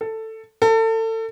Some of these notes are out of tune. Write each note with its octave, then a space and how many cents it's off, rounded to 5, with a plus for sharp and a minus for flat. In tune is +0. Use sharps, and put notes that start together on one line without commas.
A4 +10
A4 +30